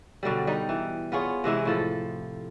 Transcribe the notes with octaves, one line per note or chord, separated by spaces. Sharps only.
B2 D3 F#3 G3
G3 D#4
E3
B3 F4 G#4 C#5
C3 E3 G#3 E4
A2 F3 A4